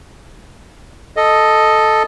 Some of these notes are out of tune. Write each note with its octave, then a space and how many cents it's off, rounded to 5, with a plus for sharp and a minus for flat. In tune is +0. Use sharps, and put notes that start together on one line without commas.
A4 +0 D#5 +0